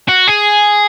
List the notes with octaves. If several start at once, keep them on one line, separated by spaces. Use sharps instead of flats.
F#4
G#4